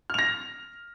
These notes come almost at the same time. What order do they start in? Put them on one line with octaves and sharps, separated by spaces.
F6 F7 A#6